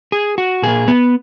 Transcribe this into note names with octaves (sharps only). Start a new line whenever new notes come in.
G#4
F#4
A#2 A#3 G#4
B3